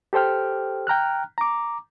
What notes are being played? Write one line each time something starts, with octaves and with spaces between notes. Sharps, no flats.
G4 A4 C5 G5 F6
G5 A#5 F6 F#6
A#5 D6